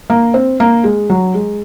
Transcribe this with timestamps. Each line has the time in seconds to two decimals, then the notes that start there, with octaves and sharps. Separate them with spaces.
0.10 A#3
0.34 C4
0.60 A#3
0.84 G#3
1.10 F#3
1.34 G#3